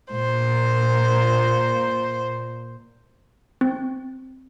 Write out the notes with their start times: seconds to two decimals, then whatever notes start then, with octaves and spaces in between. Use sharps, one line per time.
0.12 A#2 C5
3.61 C4